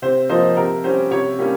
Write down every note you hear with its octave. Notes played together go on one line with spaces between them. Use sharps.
C3 C5
F3 A#3 D#4 C5
C3 A#4
G3 C#4 C5
C3 C#5
G3 A#3 C#4